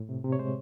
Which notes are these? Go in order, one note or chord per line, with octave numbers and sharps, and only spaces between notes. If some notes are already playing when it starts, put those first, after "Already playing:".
Already playing: A2
C3
C3
C#5
G#3 C5